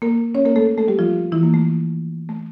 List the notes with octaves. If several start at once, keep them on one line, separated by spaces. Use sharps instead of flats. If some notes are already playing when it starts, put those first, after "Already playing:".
A#3 A#4
C#4 C#5
A#3 A#4
A3 A4
A3 A4
G3 G4
F3 F4
E3 E4
A#3
A3
A3